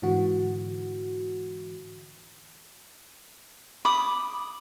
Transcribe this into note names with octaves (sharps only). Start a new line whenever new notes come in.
G#2 D3 E3 F#4
B5 D6 D#6